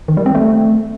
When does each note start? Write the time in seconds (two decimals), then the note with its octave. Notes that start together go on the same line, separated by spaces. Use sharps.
0.08 D#3
0.17 G3
0.26 C4
0.35 A3